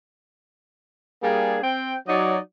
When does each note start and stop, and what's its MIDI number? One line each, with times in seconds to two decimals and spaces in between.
1.22 1.58 55
1.22 1.58 58
1.22 1.58 62
1.22 1.58 68
1.62 1.95 60
1.62 1.95 79
2.08 2.38 54
2.08 2.38 63
2.08 2.38 74